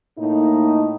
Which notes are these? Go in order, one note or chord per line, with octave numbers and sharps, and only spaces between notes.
A2 A#3 D#4